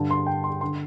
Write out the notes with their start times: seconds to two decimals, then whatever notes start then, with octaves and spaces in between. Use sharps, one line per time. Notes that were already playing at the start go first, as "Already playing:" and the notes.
Already playing: G2 D3 A5
0.11 C6
0.27 G5
0.44 C6
0.61 D3 C6